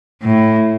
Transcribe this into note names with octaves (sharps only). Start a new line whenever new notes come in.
A2